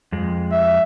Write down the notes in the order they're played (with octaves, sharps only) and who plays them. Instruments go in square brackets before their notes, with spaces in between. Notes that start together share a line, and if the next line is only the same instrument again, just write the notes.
[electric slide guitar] F2 G#3
[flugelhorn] E5